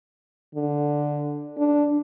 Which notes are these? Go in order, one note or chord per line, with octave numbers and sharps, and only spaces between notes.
D3
D4